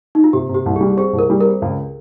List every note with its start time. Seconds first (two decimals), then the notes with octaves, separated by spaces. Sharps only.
0.15 D#4
0.24 F4
0.33 C3 G4
0.49 C3
0.54 G4
0.66 C2
0.76 G3 G#4
0.97 C4 G#4
1.13 C2
1.19 A#4
1.30 G3
1.40 C4 A#4
1.62 C#2